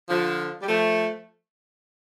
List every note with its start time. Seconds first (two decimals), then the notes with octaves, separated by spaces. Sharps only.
0.09 D3 F3
0.61 G3
0.67 F3 A3